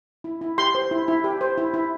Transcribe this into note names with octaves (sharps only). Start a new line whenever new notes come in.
E4
E4
G4 C6
C5
E4
E4
G4
C5
E4
E4